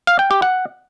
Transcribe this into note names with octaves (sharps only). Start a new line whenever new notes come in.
F5
G5
G4
F#5